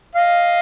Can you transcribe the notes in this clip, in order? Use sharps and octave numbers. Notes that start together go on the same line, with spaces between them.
D#5 F5